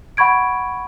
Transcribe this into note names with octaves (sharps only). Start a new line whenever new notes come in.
F#5 B5 C#6 G#6 D7